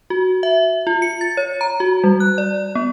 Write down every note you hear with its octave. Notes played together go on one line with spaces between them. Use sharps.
F#4
E5
F4
C#7
A6
C#5
A#5
F#4
G3
F#6
D5
B3